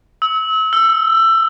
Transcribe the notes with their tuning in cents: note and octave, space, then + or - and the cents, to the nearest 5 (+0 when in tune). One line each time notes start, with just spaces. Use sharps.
E6 -35
E6 +20